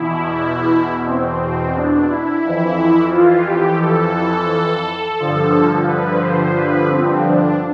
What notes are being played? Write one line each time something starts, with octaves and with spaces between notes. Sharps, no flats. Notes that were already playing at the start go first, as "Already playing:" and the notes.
Already playing: E2 B2 E4
C4
C4
D4
E4
F2 E3
F4
G4
A4
G2 D3 F3
B4
C5
B4
C4
D4